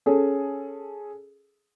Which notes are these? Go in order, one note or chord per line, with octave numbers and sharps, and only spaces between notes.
C#4 G#4 A4